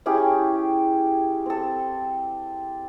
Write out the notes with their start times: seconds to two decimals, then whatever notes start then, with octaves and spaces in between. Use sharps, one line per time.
0.06 C#4 E4 G4 G#4
1.46 C4 A4